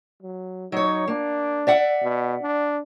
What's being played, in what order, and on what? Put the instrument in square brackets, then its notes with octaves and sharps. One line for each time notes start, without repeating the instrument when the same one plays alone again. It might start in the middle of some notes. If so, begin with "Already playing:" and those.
[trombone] F#3
[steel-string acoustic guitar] F#3 C#5 [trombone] D#4
[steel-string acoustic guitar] A#3 [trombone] D4
[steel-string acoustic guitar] D5 E5 F#5
[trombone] B2
D4